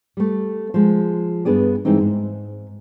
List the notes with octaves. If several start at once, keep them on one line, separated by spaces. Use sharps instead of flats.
G3 A3
F3 G#3
G2 B3 D4 G#4 D5
G2 E3 G#3 C4 D#4
G#2